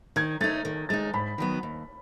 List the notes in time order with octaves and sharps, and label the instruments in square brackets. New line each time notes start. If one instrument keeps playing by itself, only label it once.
[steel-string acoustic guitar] D#3 [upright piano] G#6
[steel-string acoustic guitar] A3 [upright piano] A6
[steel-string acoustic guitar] D#4
D#3
[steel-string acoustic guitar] G#3 D#4 [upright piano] A6
[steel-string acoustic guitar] G#2 [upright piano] B5
[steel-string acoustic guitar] D#3 F#3 B3
D#2